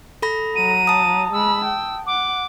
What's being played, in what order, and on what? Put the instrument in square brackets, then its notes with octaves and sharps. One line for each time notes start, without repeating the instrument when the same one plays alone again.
[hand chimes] A4 B5 A#6
[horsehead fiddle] F#3 A#5 [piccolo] D#7
[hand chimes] A5 D#6
[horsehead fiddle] G#3 B5 [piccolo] E6
[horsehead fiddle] G5
[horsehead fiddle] F#5 [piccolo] D6